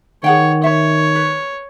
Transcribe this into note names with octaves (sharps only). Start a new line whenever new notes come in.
D#3 G#4 C#5 F#5 G5
C#5 E5
B4